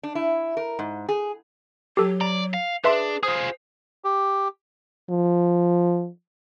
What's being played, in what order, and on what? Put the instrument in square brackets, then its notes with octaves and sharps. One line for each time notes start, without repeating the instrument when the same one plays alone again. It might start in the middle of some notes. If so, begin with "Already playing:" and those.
[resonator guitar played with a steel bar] D4
E4
A#4
G#2
G#4
[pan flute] F#3 [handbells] G4 A4
[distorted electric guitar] D5 [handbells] A#5
[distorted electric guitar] F5
[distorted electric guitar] D4 [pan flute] G#4 [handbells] B4 E5 C6
[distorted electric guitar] F4 G#4 [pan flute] C5 [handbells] D#6
[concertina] G4
[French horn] F3